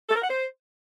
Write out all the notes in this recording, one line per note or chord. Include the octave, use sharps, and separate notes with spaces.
A4
A#4
F#5
C5